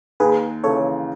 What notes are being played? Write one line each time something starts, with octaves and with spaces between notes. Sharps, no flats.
D#2 G#4 B4
C#3 E3 A4 C#5